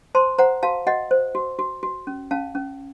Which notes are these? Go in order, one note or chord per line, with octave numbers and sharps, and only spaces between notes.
C5 A5 C6
C5 F#5 A#5
F#4 F5 A5
F#4 D#5 F#5
C5
F#4
F#4
F#4
C#4
C#4 F5 A5
C#4